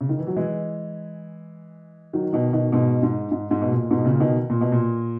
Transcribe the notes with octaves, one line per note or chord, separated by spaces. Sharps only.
C#3
D#3
E3
F#3
E3 G#3
D#3 F#3
B2 D#3
B2 D#3
G#2 B2
G#2
G#2
G#2
B2
A#2
G#2 B2
A#2 C#3
B2 D#3
A#2
B2
A#2